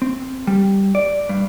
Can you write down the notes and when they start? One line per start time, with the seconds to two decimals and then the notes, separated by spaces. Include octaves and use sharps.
0.02 C4
0.47 G3
0.95 D5
1.29 G2